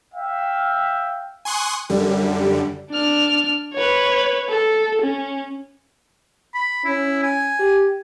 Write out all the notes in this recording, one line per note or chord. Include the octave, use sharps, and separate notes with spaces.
E5 F5 G5
G#5 C6 C#6 D#6 F#6
F#2 D3 G3
D4 F6
B4 C#5
A4
C#4
B5
C#4 E4
G#5
G4